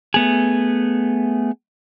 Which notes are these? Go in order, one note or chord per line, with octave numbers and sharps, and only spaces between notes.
A3 B3 G#4